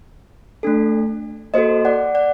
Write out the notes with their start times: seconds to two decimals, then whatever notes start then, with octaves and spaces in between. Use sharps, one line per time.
0.63 A3 D4 A4
1.54 A#3 F#4 A4 C5 D#5
1.85 D5 F#5
2.15 D5 F#5